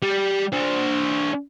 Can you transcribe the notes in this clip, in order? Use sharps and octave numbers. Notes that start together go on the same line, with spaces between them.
G3
D4 C5